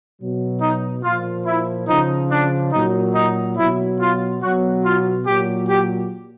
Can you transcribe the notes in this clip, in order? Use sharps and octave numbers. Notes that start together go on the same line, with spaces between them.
B2 F#3
D#4
A#2 F3 F4
E4
C#3 F3 D#4
D4
A#2 F#3 D#4
D#4
B2 F#3 E4
F4
B2 F#3 F#4
F4
A#2 F#3 G4
G4